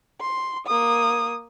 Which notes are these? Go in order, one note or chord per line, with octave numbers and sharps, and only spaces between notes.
C6
A#3 D#6